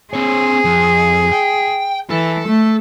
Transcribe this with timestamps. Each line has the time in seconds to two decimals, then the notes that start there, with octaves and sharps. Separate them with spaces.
0.13 C4 G#4 C#5
0.65 F2
1.32 G5
2.10 E3 A4
2.47 A3